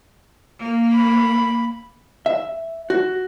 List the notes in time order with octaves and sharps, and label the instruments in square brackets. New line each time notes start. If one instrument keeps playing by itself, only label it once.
[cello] A#3
[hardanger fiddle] B5
[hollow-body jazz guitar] E5
F#4